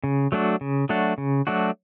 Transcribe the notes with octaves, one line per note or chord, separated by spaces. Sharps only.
C#3
F#3 A3 D4 F#4
C#3
F#3 A3 D4 F#4
C#3
F#3 A3 D4 F#4